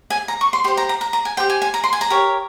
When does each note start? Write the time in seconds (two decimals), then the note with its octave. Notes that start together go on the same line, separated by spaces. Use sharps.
0.10 G#5
0.28 A#5
0.41 C#6
0.53 C6
0.64 G4 C6
0.68 C5
0.77 A#5
0.89 A#5
1.01 A#5
1.13 A#5
1.25 G#5
1.37 G4 C5 G5
1.50 G#5
1.62 G#5
1.74 A#5
1.84 C6
1.93 G#5
2.01 A#5
2.10 G4 A#4 C#5